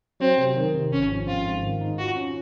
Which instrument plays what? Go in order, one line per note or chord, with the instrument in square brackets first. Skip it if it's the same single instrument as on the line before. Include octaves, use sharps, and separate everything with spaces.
[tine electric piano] F#3 [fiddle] C4
[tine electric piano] C3
D#3
C3
[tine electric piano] G#1 [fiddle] C#4
[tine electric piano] F3
[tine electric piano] C4 [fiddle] F4
[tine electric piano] G#2
D#3
D#4
[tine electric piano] F4 [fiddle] F#4
[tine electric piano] C#4